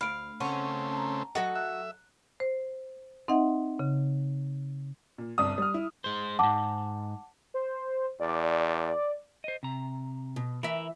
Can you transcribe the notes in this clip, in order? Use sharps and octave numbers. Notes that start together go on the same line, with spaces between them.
D2 F5 B5 D7
C#3 A3 C4 C#4 F#5 C#6
A5 A#5
F#3 F#4 A4 D#5
E5 F#6
C5
C4 D#4 D#5 E5 F#5
C#3
A#2
G1 C2 D5 A5 D#6
G3 F6
E4
G#3 C5
F2 G#2 F#5 A5 D6
C5
E2 D5
C5 D#5
C3 A#5
B2
E3 E4 A#4 E5